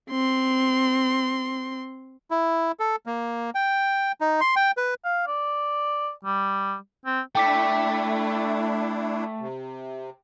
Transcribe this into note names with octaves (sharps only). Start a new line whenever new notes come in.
C4 C6
E4
A4
A#3
G5
D#4
C6
G5
B4
F5
D5
G3
C4
A3 D4 E4 G5 D6 B6
C3